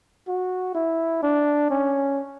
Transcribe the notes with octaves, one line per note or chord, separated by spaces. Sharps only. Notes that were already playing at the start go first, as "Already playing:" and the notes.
F#4
E4
D4
C#4